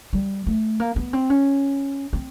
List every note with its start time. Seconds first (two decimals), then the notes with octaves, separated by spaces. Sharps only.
0.13 G3
0.47 A3
0.80 A#3
0.96 B3
1.13 C4
1.30 C#4
2.13 C4